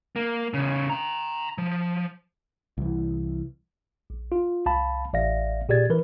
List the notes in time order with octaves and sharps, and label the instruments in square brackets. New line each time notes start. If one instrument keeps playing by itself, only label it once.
[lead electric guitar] A#3
E2 C#3
G5 A#5
F3
[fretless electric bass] C2 E3
[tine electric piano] A#1
F4
C2 F5 A5 B5
A1 D5 E5 F5 A#6
A#2 G4 G#4 D5 G#6 A6
E3 A#4 B4